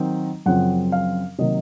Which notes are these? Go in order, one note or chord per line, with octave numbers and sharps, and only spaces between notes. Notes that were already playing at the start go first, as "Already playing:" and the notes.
Already playing: D#3 F#3 C4 D#4
F#2 C#3 F3 C4 F#5
F5
C3 D#3 F#3 A#3 D#5